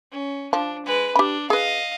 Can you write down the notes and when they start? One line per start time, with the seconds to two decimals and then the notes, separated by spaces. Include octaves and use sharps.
0.12 C#4
0.53 F3 D4
0.86 G#3 B4
1.16 D4 G4 B5
1.50 G#4 B4 D#5 F5